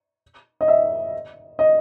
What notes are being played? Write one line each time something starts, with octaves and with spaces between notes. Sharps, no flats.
D#5
E5
D#5